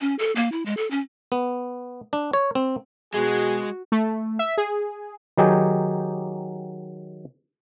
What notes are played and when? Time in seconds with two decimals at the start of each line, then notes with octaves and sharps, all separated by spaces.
0.01 C#4
0.19 A4
0.36 A#3
0.52 E4
0.66 G#3
0.77 A4
0.91 C#4
1.32 B3
2.13 D4
2.33 C#5
2.55 C4
3.14 B2 G#3 F#4 G#4
3.92 A3
4.39 E5
4.58 G#4
5.37 D#3 F#3 D#4 G4 G#4